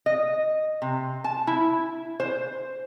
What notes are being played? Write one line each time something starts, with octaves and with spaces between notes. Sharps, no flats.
D#5
C3
A5
E4
C5